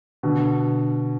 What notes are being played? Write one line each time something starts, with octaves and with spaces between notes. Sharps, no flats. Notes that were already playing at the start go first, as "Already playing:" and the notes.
B2 D3